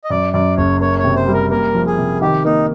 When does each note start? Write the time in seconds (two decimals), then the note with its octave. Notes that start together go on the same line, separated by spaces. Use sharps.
0.04 D#5
0.10 F#2 D5
0.33 F#2 D5
0.57 F#1 C#5
0.81 A#3 C#5
0.99 C#5
1.04 C3
1.16 C5
1.28 G3
1.33 A#4
1.50 A#3 A#4
1.75 F3
1.86 G#4
1.98 C3
2.22 D#3 G4
2.45 A#3 D#4